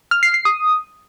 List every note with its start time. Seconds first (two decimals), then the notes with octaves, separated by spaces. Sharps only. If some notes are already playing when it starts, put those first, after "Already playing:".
0.11 F6
0.23 C7
0.34 C7
0.45 D#6